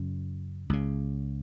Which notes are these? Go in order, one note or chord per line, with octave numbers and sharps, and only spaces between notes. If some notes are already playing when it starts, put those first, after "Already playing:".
Already playing: F#2 C#3
C#2 C#3